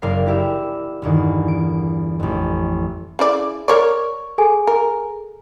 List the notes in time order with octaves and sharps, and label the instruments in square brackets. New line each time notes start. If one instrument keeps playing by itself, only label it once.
[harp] F#1 A#3 A#4 D5 F5 C7
E4 G4 A#4 E5
G1 E2 D#3
D7
A1 F2
[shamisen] C#3 E4 D5
[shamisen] A#4 C#5 D5 [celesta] C#6
[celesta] G#4 A4 G#5
[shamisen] A#4